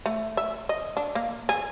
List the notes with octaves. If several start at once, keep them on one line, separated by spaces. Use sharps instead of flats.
A3
E5
D#5
D4
A#3
G#4